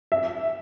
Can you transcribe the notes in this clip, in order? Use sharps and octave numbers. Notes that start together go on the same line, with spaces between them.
E5